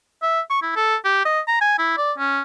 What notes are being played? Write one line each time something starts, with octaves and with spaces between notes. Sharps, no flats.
E5
C#6
E4
A4
G4
D#5
A#5
G#5
E4
D5
C#4